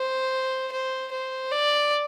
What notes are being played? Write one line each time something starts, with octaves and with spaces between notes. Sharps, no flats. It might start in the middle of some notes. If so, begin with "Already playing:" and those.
Already playing: C5
C5
C5
D5